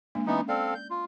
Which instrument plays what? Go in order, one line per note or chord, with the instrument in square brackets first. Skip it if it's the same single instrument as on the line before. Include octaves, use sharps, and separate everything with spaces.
[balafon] G#3 A#3 D4
[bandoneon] E3 B3 D#4 [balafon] C#4
[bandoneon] C4 A4 F5 [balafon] D5
[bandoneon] G6
F4